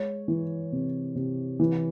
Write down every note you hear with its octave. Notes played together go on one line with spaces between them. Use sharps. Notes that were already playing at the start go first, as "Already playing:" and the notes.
Already playing: G#3 C#5
E3
C3
C3
E3